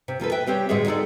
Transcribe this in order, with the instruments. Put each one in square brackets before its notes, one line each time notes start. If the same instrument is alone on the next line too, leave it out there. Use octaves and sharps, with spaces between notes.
[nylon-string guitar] C3
F3 A#3 A4 B4
B4 E5 G5
G3 C4 G4 C#5
A2 D3 G#3 F#4 G#4 E5
G#3 D#4 A4 D5